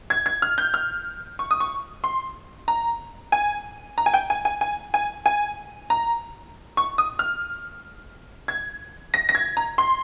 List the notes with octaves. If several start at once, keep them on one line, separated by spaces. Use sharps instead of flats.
G#6
G#6
F6
G6
F6
C#6
D#6
C#6
C6
A#5
G#5
A#5
G#5
G5
G#5
G#5
G#5
G#5
G#5
A#5
C#6
D#6
F6
G#6
A#6
A#6
G#6
A#5
C6